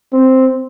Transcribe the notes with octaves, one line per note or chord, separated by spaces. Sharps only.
C4